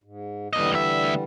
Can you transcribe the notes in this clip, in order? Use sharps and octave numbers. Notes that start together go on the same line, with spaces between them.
G#2
D#2 D3 E3 G3 D#5
D2 E5